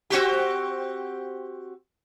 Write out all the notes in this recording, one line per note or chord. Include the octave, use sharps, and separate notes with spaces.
C4 F#4 G4